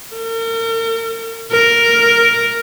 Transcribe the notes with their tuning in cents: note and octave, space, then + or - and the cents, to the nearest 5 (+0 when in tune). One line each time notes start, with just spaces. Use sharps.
A#4 -40
A#4 +0